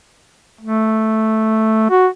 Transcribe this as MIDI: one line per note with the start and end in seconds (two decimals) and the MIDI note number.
0.61 1.86 57
1.90 2.07 66